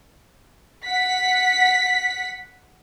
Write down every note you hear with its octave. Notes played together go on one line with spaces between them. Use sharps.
F#5 B6